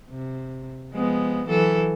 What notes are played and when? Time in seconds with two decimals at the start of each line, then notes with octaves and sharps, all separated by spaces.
0.10 C3
0.93 F3 G#3 B3
1.47 E3 F#3 A4